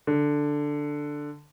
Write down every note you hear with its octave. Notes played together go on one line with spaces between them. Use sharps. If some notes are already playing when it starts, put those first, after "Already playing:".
D3